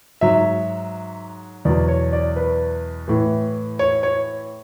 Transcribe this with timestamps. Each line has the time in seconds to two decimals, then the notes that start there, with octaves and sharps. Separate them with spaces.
0.21 G#2 F#3 E5
1.65 E2 B2 F#3 D5
1.88 C#5
2.13 D5
2.36 B4
3.08 A2 E3
3.79 C#5
4.03 C#5